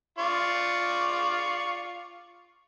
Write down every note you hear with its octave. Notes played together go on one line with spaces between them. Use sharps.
F4 D5 C#6